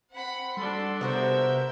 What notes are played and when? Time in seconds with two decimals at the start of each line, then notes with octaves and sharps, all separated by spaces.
0.15 C4 F#5 B5
0.57 G3 D4 F#4 A4 C6
1.01 C3 B3 F#4 A#4 C5 E5 G6